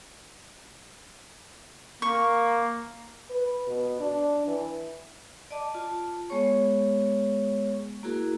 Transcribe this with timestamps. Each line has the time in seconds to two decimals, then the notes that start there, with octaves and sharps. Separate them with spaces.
2.02 A#3 C#6
3.30 B4
3.67 B2
4.00 D4
4.47 E3
5.51 D5 D#5 A5 D6
5.75 F4 A5
6.30 G#3 B3 G#4 C#5 C#6
8.03 A#3 E4 F#4 G#4 A#4